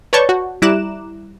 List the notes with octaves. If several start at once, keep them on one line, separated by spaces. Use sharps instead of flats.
B4 C#5 D5 A5 C#6 G6
F#4
G3 E4 A#5 D6 F#6 E7